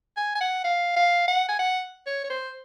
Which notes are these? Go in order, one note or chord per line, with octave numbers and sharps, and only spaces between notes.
G#5
G#5
F#5
F5
F5
F#5
G#5
F#5
C#5
C#5
C5